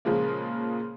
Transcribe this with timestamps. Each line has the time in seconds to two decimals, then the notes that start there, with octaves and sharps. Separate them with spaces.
0.05 A#2 C#3 F3 G#3 A#3